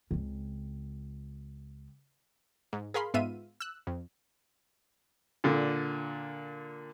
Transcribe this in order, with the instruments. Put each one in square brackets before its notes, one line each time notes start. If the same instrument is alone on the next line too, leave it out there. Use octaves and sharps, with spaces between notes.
[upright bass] C#2 C4
[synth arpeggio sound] G#2
G#4 A#4 F5 B5 C6
G#2 B3 F4 E5 F5 D#7
E6 F#6
F2
[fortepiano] A#2 D3